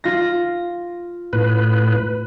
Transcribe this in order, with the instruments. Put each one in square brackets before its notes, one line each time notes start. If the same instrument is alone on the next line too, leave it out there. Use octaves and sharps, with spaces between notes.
[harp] F4 A#6
[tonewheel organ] A2 B4